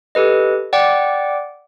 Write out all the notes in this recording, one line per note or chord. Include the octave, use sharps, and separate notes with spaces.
G4 A4 B4 D#5
D5 F#5 G5 D6